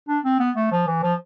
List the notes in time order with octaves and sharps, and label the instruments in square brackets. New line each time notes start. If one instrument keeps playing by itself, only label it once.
[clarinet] D4
C4
B3
A3
F3
E3
F3